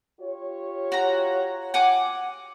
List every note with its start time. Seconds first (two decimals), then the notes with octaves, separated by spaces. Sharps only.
0.20 F4 G4 C#5
0.92 F#4 A#5
1.74 F#5 G#5 D6